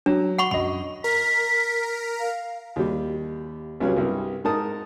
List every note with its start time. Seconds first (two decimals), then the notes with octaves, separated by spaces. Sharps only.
0.06 F#3 D4
0.39 F#5 B5 C#6
0.51 F#2 D#5 B5
1.04 A#4 B6
2.20 F5
2.76 D#2 G3
3.80 C#2 G2 F#3 C#4
3.96 C2 G2
4.44 G#2 D#4 A#4 A5 D#6